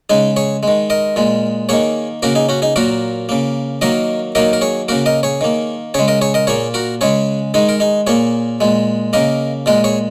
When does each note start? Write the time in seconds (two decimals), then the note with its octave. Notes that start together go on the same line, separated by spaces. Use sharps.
0.10 C#3 G#3 D#4 G#4
0.36 G#4 C#5
0.63 D#3 G#3
0.90 A#4 D#5
1.16 A#2 G#3
1.69 D#3 A#3 G#4 C#5
2.23 C#3 A#3 F#4 A#4
2.35 D#4 G#4
2.49 C#4 F#4
2.62 D#4 G#4
2.76 A#2 F#3 A#3 F#4 A#4
3.29 C#3 A#3
3.81 D#3 F#3 A#3 A#4 D#5
4.35 D#3 F#3 A#3 A#4 D#5
4.53 A#4
4.61 G#4 C#5
4.88 C#3 A#3 F#4 A#4
5.06 A#4 D#5
5.23 G#4 C#5
5.41 D#3 A#3
5.94 C#3 G#3 G#4 C#5
6.08 A#4 D#5
6.21 G#4 C#5
6.34 A#4 D#5
6.47 A#2 A#3 G#4 C#5
6.74 F#4 A#4
7.01 C#3 G#3 G#4 C#5
7.54 D#3 G#3 D#4 G#4
7.69 A#4
7.80 D#4 G#4
8.07 A#2 A#3 G#4 C#5
8.61 A#2 G#3
9.13 C#3 A#3 A#4 D#5
9.66 A#2 G#3 A#4 D#5
9.84 G#4 C#5